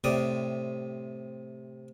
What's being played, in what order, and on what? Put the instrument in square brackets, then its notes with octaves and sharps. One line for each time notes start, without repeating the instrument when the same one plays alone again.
[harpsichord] A2 C3 D5 D#6